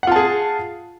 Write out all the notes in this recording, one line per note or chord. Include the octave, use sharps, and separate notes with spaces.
F4 G#4 F#5 A5